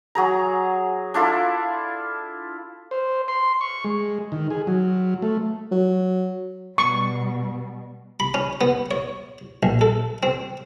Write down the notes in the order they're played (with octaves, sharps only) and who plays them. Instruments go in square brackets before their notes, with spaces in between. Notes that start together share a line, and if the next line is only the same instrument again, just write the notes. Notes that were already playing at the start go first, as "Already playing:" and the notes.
[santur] F#3 G#4 A#5
D4 E4 F4 A4
[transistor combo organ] C5
C6
C#6
G#3
D#3
G#4
F#3
A3
[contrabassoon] F#3
[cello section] B2 G3 [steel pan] C#6
[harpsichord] B5
C#4
B3
C#5
A#1
A4
C4